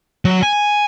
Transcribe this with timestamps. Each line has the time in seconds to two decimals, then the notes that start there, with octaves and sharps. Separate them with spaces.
0.25 F#3
0.43 G#5